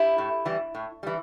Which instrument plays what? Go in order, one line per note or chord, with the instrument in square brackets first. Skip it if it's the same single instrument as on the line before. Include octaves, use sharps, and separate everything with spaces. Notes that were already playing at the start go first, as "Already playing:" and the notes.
Already playing: [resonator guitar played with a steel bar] E4 G4
A2
E3 G3
A2
E3 G3